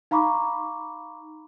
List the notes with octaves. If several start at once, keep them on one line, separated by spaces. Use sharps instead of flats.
D#4 F5 A#5 B5 C#6 D6